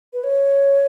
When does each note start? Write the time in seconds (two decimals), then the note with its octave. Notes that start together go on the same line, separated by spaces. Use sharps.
0.13 B4
0.24 C#5